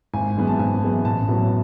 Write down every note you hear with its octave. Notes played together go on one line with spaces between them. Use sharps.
G#1 G#5
F#2 E3 G#3 B3
A5
G#1 G#5
F#2 E3 G#3 B3
A1 A5
A2 F#3 B3